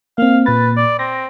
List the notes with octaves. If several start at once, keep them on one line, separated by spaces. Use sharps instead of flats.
A#3 C4 F5
A#2 B4 A6
D5
C4 A#6